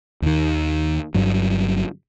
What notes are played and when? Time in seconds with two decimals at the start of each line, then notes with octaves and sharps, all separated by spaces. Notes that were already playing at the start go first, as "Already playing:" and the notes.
0.22 D#2 D#3
1.14 G1 G2 F#3